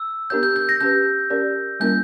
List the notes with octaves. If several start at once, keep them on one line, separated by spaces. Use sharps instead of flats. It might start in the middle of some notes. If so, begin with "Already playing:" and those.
Already playing: E6
B3 D4 G4 A#4 C#5 G6
G6
G6
A#6
C#4 G4 B4 G6
C#4 G4 A#4 D5
G3 A#3 C#4 E4 A#4 G6